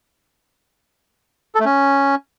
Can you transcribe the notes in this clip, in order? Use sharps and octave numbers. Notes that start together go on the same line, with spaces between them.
A4
A3
C#4